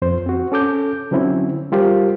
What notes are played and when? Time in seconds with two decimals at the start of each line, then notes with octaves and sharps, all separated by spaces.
0.02 F2 C5
0.26 C4 F#4
0.52 C#4 A4 D6 G6
1.11 D3 F#3 C4 C#4 E4
1.72 G3 F4 G4 A#4 C5